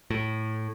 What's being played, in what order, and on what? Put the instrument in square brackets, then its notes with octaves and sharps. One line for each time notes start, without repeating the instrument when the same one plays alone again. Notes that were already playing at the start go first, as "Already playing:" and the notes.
[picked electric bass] A2